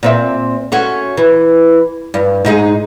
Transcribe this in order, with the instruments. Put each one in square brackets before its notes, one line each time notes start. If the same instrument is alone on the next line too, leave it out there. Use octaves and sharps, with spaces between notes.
[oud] A#2 C4 E5
A3 C#4 F#4
E3
G2
G#2 D#4 G#4